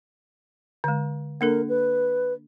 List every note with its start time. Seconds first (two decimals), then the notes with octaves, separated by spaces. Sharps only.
0.84 D3 G#3
1.41 A#3 D4 A4 A#4
1.68 B4